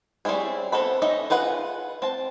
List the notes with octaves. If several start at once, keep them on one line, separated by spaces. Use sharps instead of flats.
G3 C4 C#4 E4 G#4
B3 C4 A4 B4 B5
C#4 D#4 D#5 E5
F4 G#4 B4 F#5
C4 A5